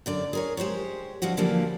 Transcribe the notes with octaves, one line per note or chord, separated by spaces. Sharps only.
F#2 D3 D5
G#4 A#4 C#5
G#3 G4 C5 C#5
D2 F3 G3 C4 F#4
D3 E3 F3 G3 A#3